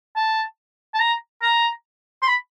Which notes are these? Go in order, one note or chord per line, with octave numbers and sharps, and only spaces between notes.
A5
A5
A#5
A#5
C6
B5